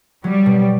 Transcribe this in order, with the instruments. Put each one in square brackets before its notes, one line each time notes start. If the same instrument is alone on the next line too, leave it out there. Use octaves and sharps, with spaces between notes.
[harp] F#3 [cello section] G3
[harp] B2